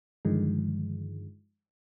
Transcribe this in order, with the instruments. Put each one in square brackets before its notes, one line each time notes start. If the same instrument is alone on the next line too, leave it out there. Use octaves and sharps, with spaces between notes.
[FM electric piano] G2 D3 D#3 F3 G#3